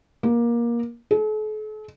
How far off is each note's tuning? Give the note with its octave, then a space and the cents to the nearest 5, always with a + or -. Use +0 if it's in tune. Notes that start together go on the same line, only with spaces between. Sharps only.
A#3 +20
A4 -45